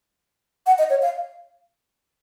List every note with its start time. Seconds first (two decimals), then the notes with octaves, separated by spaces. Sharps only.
0.66 F#5
0.79 D#5
0.90 C#5
1.02 F5